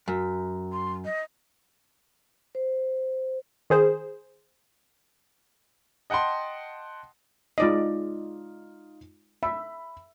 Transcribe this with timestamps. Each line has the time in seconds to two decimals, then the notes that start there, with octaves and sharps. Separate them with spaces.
0.08 F#2
0.72 C6
1.05 D#5
2.55 C5
3.70 D#3 G#4 C5
6.10 D#5 F#5 G5 A5 C6
7.58 G#3 D#4 F4 D5 D#5
9.43 E5 B5